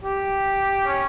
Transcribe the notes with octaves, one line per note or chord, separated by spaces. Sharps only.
G4
C#4